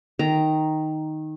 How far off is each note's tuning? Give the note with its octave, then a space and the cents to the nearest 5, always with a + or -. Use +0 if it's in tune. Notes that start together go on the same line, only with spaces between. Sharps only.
D#3 +0 A#5 +0